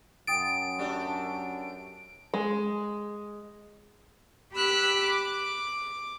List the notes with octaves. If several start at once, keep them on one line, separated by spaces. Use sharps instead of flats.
F#2 G5 D#6 A6 D7
A3 D4 G4
G#3
G4 B5 E6 F#6
D6